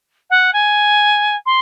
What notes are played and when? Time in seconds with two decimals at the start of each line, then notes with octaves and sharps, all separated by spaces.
0.30 F#5
0.53 G#5
1.46 C6